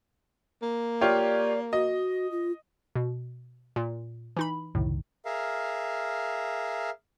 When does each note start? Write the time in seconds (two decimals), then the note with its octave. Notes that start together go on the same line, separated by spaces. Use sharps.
0.62 A#3
1.01 F4 G4 C#5 D5
1.73 F#4 D#5
2.31 F4
2.95 B2
3.76 A#2
4.37 E3 D#4 B5
4.75 F#1 C2 A2 D#3
5.25 G#4 A#4 E5 F5